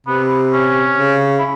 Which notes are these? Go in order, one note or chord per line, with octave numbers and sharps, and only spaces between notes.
C3 B3
C#4
C#3
E4